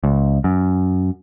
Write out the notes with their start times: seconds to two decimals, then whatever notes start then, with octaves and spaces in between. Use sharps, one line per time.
0.04 C#2
0.44 F#2